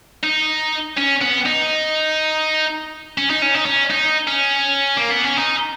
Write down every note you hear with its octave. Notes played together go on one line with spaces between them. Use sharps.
D#4
C#4
B3
D#4
C#4
D#4
C#4
D#4
C#4
D#4
C#4
A#3
B3
C#4
D#4